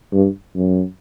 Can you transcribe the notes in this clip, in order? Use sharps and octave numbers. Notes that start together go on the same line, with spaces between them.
G2
F#2